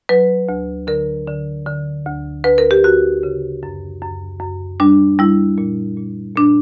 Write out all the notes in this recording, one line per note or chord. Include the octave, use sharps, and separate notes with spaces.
F#3 B4
D2
D3 A#4
D3
D3
D2
D2 B4
A#4
G4
D2 F#4
C#3
F#2
F#2
F#2
G3 D4
G3 E4
A#2
A#2
A#2 D4